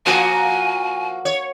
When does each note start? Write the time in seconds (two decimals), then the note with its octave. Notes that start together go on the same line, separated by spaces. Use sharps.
0.06 F3 A#3 F#4 G#5
1.25 C#5